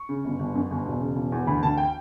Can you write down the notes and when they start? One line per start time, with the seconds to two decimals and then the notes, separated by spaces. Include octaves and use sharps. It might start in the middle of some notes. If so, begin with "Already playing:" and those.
Already playing: C#6
0.09 C#3
0.25 G1
0.39 G1
0.55 F#2
0.71 G1
0.86 E1
1.01 C#3
1.16 E1
1.32 E2
1.47 D2 B5
1.63 D2 A5
1.77 G5